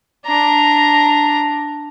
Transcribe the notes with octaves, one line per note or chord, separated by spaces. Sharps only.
D4 A#5